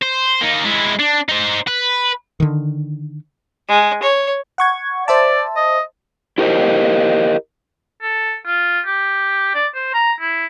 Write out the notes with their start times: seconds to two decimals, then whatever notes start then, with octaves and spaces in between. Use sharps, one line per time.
0.03 C5
0.42 A#3 D#4
0.65 G#3 E4
1.00 D4
1.29 D#4 C5
1.67 B4
2.40 D3 D#3
3.69 G#3
4.03 C#5
4.58 F#5 C#6 G#6
5.08 C5 D5 E5 A5
5.56 D#5
6.38 E4 G4 A#4 C5 D#5
8.02 A4
8.46 F4
8.86 G4
9.55 D5
9.74 C5
9.94 A#5
10.21 E4